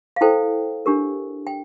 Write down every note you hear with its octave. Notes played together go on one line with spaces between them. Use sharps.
F5
E4 A4 C5 G5
D4 G4 A#4
G5